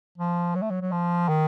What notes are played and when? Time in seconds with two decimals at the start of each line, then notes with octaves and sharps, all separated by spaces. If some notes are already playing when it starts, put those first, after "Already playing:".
0.18 F3
0.55 F#3
0.62 A3
0.71 F#3
0.81 F#3
0.92 F3
1.29 D#3